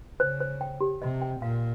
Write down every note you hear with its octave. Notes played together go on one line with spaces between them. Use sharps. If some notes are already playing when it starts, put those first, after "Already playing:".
C#3 C5
C5
G5
G4
C3 D#5
G5
A#2 F5